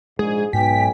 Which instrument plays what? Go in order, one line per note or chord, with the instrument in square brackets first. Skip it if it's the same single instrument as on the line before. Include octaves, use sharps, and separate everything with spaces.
[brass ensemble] A#1 G#2 [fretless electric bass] G#3 [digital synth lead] G#4
[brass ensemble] B1 G#5 [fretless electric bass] G#2 [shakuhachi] G5 [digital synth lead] B6